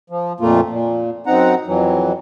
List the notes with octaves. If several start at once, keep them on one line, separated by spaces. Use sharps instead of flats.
F3
F2 A#2 A3 A#3 F4
A#2
F#2 C4 D#4 F#5 A#5
F2 E3 F#3